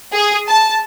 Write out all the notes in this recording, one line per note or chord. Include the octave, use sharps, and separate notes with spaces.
G#4
A5